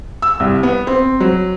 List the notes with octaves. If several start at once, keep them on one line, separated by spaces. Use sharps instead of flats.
E6
C2
B3
C4
F#3